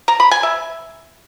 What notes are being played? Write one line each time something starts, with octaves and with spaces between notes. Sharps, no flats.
A#5
B5
G#5
E5